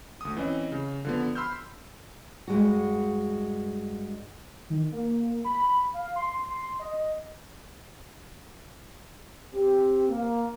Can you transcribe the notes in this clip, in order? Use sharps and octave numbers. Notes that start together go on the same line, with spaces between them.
D2 D#6
E3 C4 C#4 D#5
C#3
D3 F3 B3
B5 C6 E6 F6 G6
G2 G#3 F#4
D#3
A#3
B5
F5
C6
D#5
C4 G4
A#3